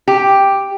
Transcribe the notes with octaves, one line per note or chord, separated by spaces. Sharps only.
G4